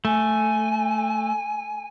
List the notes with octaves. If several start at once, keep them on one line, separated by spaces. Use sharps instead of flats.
A3 G#5